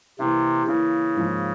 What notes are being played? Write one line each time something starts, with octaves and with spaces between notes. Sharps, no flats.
C3 E3 A#3 E4
C#3 E3 A#3 E4
G#2 F3 A#3